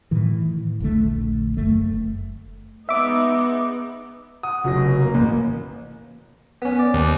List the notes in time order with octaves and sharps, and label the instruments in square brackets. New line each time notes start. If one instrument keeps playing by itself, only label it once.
[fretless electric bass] A2 D#3 E3
D#1 A#1 D3 A3
F#1 A3
[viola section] G#3 B3 D#4 [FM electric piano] E5 D6
[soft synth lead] F#5 [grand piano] D#6
[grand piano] F1 F#3 A#6 [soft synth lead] C#3
[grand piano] A#3
[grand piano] A1 [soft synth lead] A#3
[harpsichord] B3 C#4
D5
[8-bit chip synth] D#2